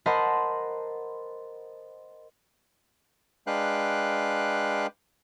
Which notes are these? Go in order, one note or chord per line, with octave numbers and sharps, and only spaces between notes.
A#4 C5 D#5 F#5 A5 B5
G#3 D4 B4 F5 G5 F#6